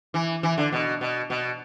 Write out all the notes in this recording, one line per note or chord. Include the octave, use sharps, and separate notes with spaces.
E3
E3
D3
B2
B2
B2